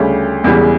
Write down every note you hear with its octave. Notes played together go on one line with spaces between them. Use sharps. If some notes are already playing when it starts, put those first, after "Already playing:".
Already playing: D2 C#3 G3 C#4 G4
E1 E2 C#3 E3 G3